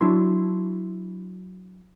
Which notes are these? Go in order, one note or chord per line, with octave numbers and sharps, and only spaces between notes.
F#3 D4 E4 C6